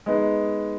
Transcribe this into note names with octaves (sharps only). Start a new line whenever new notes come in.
G#3 B3 D#4